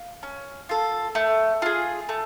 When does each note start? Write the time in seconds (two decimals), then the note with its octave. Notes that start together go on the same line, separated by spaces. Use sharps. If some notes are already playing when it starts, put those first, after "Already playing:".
Already playing: F5
0.23 C#4
0.69 F4 A4
1.15 A3
1.62 F4 G#4
2.09 A3